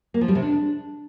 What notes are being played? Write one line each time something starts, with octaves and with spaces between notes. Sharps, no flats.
A#3
F3
G3
C3
D4